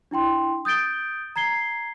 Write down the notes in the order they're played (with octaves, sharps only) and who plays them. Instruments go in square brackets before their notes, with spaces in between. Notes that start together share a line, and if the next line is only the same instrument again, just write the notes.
[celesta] D4 E4 G5 C6
D#6 G6 A6 D7 G7
A#5 G#6 C7 G7